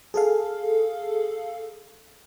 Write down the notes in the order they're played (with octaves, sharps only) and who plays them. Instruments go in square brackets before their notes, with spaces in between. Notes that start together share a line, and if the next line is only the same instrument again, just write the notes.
[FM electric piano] G#4 A4 F5